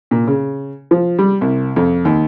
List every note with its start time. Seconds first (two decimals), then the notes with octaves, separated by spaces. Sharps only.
0.11 A#2
0.27 C#3
0.91 F3
1.19 G3
1.41 C2
1.76 F2
2.05 D#2